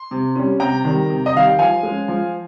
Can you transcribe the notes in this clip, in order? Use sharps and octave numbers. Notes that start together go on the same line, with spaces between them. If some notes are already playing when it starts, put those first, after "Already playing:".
Already playing: C6
C3
G3 C#4
C3 G5 A#5
D#3 G3
C3
D#5
D#3 G3 F5
G5
F3 F5 G#5
G#3 C#4
F3